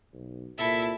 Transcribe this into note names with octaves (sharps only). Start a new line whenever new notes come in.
B1
C2 A#2 E4 A4 E5